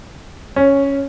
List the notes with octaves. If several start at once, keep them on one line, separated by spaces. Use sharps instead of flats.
C#4